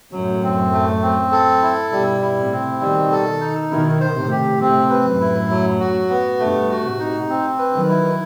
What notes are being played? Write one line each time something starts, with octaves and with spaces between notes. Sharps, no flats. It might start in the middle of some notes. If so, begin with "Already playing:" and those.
F#2 A2 F#3
C4
A3
C4
A4
E4
G2 B2 G3
E4
A2 C3
C4
B2 D#3 G3
A4
D#4
B2 D#3 E4
C5
A2 C3
G4
A2 C3 C4
B4
F#2 A2
E4
F#3
F#4
B3
G2 B2 A3
F#4
A2 C3
D#4
C4
B4
D#3 F#3
E4